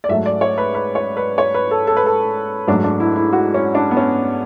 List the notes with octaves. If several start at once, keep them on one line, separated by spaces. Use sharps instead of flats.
D5
G#2 F#3 A3 E5
D5
C#5
B4
B4
C#5
B4
C#5
B4
A4
A4
B4
A4
G#2 F#3 A3 D4
D4
E4
E4
F#4
C#4
D4
B3
C#4